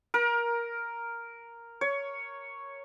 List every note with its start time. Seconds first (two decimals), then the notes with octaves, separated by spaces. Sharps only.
0.14 A#4
1.81 C#5